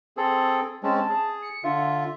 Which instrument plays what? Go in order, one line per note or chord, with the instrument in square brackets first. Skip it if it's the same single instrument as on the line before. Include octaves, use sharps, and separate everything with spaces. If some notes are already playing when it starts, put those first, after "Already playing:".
[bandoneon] C4 G#4 A4
[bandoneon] G#3 C4 C#4 [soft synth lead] A5
[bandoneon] G#4
[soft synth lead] C#7
[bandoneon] D3 F4 [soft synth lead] E5